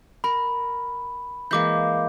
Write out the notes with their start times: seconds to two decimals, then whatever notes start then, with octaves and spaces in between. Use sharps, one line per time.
0.24 A#4 B5
1.51 E3 G#3 A#3 D6 G6